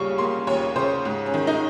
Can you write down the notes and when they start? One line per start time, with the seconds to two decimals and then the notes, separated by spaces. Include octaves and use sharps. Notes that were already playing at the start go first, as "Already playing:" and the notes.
Already playing: D#2 C#3 G3 C#6
0.18 A#3 C6
0.47 D#2 C#5
0.76 C#3 C5
1.05 G#2
1.26 C#4
1.34 D#3
1.47 D#4